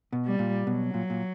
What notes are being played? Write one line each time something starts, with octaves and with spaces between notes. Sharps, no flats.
B2
G3
A#2
B2 F#3
A#2
A#2